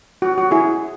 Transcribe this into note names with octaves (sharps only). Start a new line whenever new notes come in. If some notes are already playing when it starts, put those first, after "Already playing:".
F#4
F#4
E4 G#4